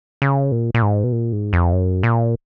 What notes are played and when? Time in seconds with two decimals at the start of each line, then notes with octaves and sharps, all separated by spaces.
0.22 C#3
0.52 A#2
0.74 A#2
0.82 G#2
1.04 B2
1.12 A#2
1.33 G#2
1.53 F2
1.73 F#2
2.03 A#2